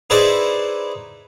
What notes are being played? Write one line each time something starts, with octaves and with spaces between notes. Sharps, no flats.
D#4 E4 G#4 B4 C5 D5